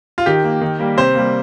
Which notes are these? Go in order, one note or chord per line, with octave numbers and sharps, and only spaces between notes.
F4
D#3 G4
A#3
D#3
G3 A#3
C3 C5
G3 A#3